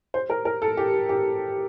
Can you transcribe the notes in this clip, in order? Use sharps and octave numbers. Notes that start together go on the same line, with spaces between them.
C5
A#4
A#4
A4
G4
G4